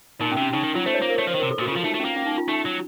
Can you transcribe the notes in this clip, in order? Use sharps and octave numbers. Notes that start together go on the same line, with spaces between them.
A#2 D#4
C#4
C3
C#4
C#3 D#4
D#3
F#3 F4
A3 C5
C#5
A#3 C5
A#4
A3 C#5
F3 C5
D#3
C3 A#4
A4
A#2
F#4
C#3
F3 F4
A3 D#4
A3
C#4
A#3
C#4
D#4
F4
A3 D#4
F#3